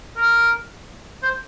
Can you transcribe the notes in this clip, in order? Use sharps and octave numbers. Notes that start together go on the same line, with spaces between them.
A#4
C5